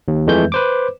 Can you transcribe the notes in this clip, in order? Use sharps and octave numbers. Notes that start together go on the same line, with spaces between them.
D#2
F2 E3 G#3 A3 G6
B4 C5 D6